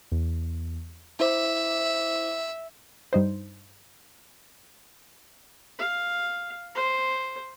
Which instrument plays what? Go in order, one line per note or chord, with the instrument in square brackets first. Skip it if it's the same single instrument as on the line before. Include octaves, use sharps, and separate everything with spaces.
[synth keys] E2
[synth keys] E4 C5 D6 [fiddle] E5
[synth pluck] G2 D#4 C5
[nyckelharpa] F5
C5